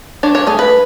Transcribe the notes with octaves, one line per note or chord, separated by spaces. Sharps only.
D4 C#5
C#5
A3 G#4
B4